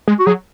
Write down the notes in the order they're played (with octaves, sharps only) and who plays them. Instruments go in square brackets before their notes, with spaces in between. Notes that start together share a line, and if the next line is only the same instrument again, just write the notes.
[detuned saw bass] G#3
[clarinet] F#4
[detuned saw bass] F#3 [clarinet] G#4